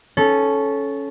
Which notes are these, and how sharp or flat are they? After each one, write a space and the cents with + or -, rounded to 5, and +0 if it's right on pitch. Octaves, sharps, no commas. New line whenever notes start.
C#4 +0 A4 -15